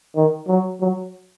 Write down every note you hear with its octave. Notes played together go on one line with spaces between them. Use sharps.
D#3
F#3
F#3